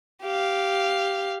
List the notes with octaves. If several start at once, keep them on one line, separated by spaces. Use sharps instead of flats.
G4 F5